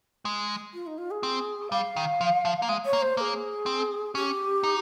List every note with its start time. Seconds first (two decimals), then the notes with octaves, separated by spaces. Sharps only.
0.25 G#3
0.74 F4
0.87 D#4
0.98 F4
1.11 G#4
1.23 C4
1.72 G3 F5
1.96 D#3
2.21 F3
2.45 F3
2.62 A#3
2.69 G#3
2.86 C#5
2.93 A#3
3.01 C5
3.17 A#3 C5
3.21 G#4
3.66 C4
4.15 C#4 G4
4.63 D#4